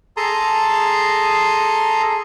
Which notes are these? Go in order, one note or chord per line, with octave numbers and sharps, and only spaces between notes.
G#4 A4 A5 A#5 C6 D#6